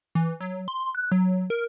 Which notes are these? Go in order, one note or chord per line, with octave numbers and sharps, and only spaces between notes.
E3
F#3
C6
F#6
F#3
A#4